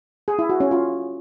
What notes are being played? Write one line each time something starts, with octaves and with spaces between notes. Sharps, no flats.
G#4
E4
F#4
C#4
F4